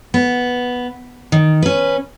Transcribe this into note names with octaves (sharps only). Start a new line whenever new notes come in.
B3
D#3
C#4 B4